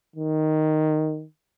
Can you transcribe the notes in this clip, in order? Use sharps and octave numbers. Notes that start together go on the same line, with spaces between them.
D#3